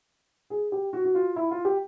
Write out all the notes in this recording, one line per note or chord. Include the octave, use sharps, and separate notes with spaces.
G#4
G4
F#4
F#4
F4
E4
F4
G4